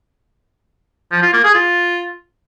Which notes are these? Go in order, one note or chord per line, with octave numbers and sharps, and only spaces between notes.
F3
F4
A#3
G#4
F4